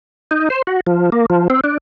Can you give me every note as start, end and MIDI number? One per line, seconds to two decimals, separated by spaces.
0.31 0.49 63
0.50 0.62 72
0.67 0.80 66
0.87 1.10 53
1.12 1.26 58
1.30 1.48 53
1.50 1.61 60
1.64 1.78 62